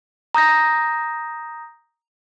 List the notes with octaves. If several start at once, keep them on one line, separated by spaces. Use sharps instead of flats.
A#5 D#6 G6 A#6